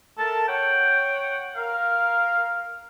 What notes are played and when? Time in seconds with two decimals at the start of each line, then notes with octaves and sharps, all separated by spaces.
0.18 A4 A#4 E5 A5
0.48 C#5 F#5 G5
1.56 A#4 F5